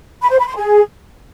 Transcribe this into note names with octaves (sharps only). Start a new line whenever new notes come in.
B5
C5
B5
C6
G#4